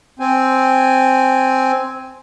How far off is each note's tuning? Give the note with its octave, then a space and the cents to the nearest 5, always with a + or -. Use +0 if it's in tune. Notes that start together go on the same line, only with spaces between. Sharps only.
C4 +0 G#5 +0